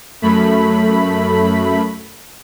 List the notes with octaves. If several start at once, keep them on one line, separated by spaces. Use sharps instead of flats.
F#2 A3 B5